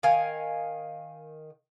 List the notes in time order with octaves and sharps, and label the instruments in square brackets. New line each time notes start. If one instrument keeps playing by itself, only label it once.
[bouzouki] D#3 A#4 F5 G#5